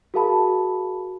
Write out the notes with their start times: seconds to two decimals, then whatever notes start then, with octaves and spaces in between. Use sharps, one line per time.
0.14 F#4 G#4 A#4 F5 A5 B5